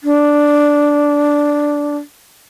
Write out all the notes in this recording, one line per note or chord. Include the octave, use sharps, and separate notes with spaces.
D4